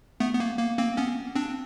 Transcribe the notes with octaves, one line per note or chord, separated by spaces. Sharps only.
A3 B3
B3
A#3
A#3
A#3 C4
B3 C#4
C4 D4